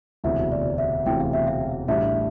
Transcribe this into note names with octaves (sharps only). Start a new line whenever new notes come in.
E1 D2 C3 E3 E5
D5
E5
E1 D2 C3 E3 G5
F5
E5
F5
A1 A2 G3 D4 E5